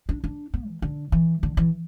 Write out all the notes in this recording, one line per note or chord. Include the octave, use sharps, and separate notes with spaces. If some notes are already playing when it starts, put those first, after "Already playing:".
D4
D4
B3
E3
D3
E3
D3
E3